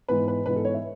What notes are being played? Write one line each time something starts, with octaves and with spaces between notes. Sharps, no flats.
G#2 E3 B3 B4
B4
G#2 E3 B3 B4
A4
C#5
E5